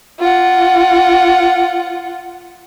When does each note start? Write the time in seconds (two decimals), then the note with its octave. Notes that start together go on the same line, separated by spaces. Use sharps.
0.20 F4 F#5